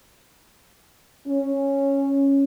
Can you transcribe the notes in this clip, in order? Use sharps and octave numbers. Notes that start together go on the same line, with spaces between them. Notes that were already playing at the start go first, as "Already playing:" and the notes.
C#4